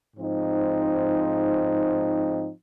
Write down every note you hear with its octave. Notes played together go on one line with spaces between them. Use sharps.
G#2 F3 C4 D#4